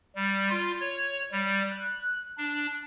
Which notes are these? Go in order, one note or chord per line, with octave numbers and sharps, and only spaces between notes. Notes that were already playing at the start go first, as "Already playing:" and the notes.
G3
F4
C#5
G3
F#6
D4